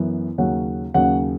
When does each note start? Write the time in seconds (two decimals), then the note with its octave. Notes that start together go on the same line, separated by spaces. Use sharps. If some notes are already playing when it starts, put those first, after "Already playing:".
Already playing: F#2 E3 B3
0.38 D#2 C#3 F#3 C#4 F#5
0.94 D#2 C#3 F#3 C#4 F#5